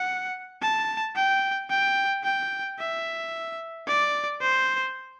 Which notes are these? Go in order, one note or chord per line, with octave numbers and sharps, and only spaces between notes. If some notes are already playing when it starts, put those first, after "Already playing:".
Already playing: F#5
A5
G5
G5
G5
E5
D5
C5